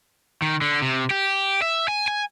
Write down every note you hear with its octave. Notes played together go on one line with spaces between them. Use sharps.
D#3
D3
C3
G4
E5
G#5
G#5